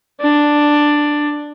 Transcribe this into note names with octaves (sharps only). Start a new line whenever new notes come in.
D4